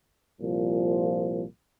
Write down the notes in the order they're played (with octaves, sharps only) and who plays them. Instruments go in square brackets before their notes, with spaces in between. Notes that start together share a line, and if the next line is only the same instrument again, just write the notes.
[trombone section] C2 A#2 F3